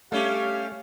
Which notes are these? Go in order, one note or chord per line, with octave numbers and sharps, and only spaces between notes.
G3 A3 C#4 G4 F5